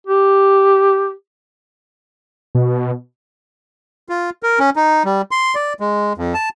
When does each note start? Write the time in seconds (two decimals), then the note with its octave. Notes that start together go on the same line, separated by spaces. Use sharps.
0.07 G4
2.55 B2
4.09 F4
4.43 A#4
4.60 C#4
4.76 D#4
5.05 G3
5.31 C6
5.55 D5
5.80 G#3
6.18 F2
6.34 A5